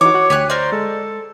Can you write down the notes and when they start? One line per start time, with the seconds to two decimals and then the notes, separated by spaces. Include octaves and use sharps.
0.01 E3 D#4 F#4 C#5 D6
0.14 F#4 F#5
0.30 D2 G4 G#5 F#6
0.50 A#4 C5 D5
0.72 G#3 A4